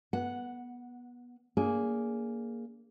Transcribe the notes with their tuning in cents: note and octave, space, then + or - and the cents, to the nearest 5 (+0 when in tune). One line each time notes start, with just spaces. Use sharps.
B3 -20 F#5 +0
A#3 +0 D4 -40 G#4 +0